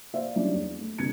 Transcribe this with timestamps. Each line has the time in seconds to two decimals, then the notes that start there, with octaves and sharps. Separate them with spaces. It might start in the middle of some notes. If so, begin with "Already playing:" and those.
0.14 C5 D5 E5 F5
0.35 E3 F#3 G3 C#4 D4 D5
0.53 E2
0.80 A3
0.98 C2 D3 G#6 C#7